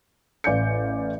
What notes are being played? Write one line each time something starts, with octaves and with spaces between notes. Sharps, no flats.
A1 D5 F5 G#5 G6 C#7